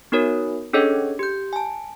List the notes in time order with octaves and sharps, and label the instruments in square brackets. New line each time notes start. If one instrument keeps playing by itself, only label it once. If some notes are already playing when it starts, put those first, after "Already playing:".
[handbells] B3 D#4 F#4 A#4 C#5
C#4 D4 G#4 A4 C#5 D#5
G4 G6
G#5 A5